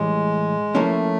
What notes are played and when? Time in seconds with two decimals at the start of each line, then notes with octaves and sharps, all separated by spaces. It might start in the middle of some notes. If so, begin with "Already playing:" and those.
Already playing: A2 E3 G3 G#3
0.74 F3 A3 A#3 C#4 E4